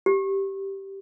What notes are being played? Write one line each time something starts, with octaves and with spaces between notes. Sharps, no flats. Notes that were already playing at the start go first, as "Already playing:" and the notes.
G4